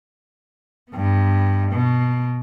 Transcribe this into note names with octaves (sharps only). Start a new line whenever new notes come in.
G2 B3
B2